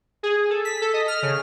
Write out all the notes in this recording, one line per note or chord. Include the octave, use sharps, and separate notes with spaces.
G#4
A4
B6
A4
D#5
F6
C#3